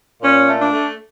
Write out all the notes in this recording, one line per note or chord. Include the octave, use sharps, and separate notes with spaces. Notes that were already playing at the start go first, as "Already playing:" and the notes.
A#2 C#4
A3
D4
A3